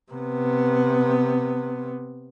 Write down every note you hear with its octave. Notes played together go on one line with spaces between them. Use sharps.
C3 B3